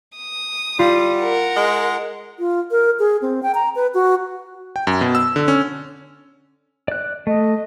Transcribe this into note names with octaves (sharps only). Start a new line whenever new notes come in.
D#6
G3 F4
A#4 F#5
G#3
F4
A#4
G#4
C4
G5
A#5
B4
F#4
G5
F#2
B2
E6
D3
C#4
D5 F#6
A3 D#5